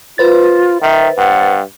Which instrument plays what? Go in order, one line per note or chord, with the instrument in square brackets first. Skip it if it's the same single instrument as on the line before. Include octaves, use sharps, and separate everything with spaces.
[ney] F4 [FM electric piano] B4 C5 A6
[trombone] D#3 [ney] E5
[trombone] G2 [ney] F#5